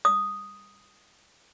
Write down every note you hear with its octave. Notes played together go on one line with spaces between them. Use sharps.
D#6